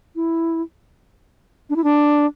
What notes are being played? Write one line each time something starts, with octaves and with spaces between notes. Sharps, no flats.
E4
D4
E4
D4